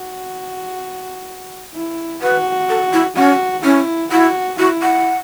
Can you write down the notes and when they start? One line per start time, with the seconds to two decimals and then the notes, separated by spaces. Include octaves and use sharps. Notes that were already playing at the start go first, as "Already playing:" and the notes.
Already playing: F#4
1.74 E4
2.22 F#4 B4
2.70 A4
2.93 E4
3.16 C#4 F#4
3.64 C#4 E4
4.11 E4 F#4
4.59 E4 F#4
4.82 F#5